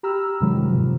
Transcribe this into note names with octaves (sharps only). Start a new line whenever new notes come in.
G4 A#5 B5 E6 F6
F#2 C3 D#3 F3 F#3 G#3
G#2 C3 F3